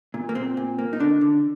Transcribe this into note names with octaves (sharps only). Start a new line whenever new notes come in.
A#2
A#3
A#2 C4
A#2
A#3
D#4
D3 D4
D3